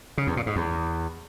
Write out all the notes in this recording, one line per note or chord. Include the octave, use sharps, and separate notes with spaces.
C#3
E2
A#2
G#2
E2